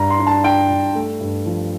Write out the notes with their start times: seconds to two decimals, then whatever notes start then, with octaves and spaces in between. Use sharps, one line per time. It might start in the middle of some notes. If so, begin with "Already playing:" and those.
Already playing: G2 A#5
0.10 C6
0.19 D4
0.27 A5
0.44 D4 G5
0.70 G2
0.95 A3
1.21 G2
1.46 F3